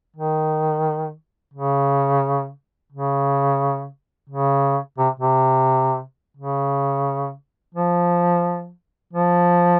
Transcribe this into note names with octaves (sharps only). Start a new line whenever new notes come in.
D#3
C#3
C#3
C#3
C3
C3
C#3
F3
F3